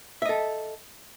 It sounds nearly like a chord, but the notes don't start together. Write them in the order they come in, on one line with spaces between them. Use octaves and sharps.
E5 D#5 A4